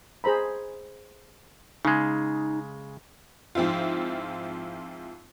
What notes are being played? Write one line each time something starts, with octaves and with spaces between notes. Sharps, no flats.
G#4 C5 A#5 B5
C#3 G#3 D#4
G#2 F3 C4 E4 F4